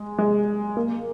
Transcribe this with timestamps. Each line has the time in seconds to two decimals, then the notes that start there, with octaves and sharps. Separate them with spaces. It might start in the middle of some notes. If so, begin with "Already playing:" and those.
Already playing: G#3
0.19 G#3
0.77 A#3